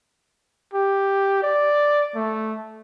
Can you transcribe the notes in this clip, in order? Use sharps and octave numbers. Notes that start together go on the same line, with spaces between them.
G4
D5
A3